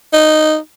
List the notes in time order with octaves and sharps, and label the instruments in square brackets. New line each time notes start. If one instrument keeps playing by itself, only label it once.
[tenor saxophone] D#4